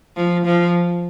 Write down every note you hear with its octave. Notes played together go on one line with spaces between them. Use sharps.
F3
F3